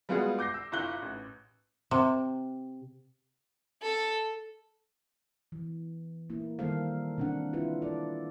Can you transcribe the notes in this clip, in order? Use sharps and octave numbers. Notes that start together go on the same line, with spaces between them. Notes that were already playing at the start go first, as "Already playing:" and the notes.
G3 G#3 B3 F4 F#4 G#4
D6 G6 A#6 C7
E6
G1 E4 F4 F#6 G7
A1
C3
A4
E3
A#3 E4
D#3 G3 A#3 A4 C5 F5
C3 D4 F#5
E4 F4 B4
A4 D5